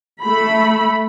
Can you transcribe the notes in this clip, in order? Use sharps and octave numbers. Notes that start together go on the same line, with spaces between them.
A3 B5